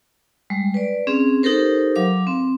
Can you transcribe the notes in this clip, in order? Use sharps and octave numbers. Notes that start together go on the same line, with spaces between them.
G3 G#3
B4 D5
C4 C#4 G#4
D#4 G4 A4 A#4 C5
F#3 F5 D6
C4